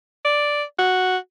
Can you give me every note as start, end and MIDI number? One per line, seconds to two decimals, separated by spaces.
0.25 0.63 74
0.79 1.17 66